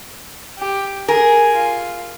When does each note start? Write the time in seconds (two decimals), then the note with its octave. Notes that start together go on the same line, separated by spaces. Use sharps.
0.58 G4
1.08 G#4 A#4 G#5
1.55 F4